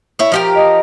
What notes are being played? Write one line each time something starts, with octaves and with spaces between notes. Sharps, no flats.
E4 C#5
F3 G4 A#4
D#5